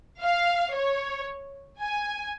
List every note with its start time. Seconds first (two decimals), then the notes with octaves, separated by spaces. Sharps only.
0.22 F5
0.74 C#5
1.80 G#5